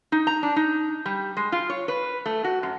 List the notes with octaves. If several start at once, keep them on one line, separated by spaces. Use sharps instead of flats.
D#4
A#5
D4
D#4
G3
G#3
F4
C#5
B4
A3
F#4
F#2